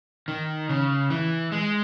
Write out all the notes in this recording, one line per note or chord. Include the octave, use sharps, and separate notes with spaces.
D#3
C#3
E3
G#3